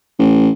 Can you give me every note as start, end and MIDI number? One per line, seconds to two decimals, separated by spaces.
0.19 0.50 33